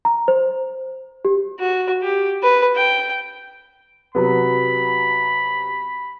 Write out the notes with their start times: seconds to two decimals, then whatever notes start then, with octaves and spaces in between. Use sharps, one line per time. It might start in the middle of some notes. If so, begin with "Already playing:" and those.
0.05 A#5
0.28 C5
1.25 G4
1.59 F#4
2.03 G4
2.43 B4
2.75 G5
4.15 C3 F#3 B3 B5